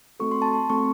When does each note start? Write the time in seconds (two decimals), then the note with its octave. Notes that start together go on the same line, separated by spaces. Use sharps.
0.20 A3 C4 F#4 A4 C#6
0.31 C6
0.42 A5
0.53 C6
0.70 A3 C4 F#4 A4 C#6